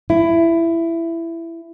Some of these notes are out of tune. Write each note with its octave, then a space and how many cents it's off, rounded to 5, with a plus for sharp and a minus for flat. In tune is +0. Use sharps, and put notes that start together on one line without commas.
E4 +15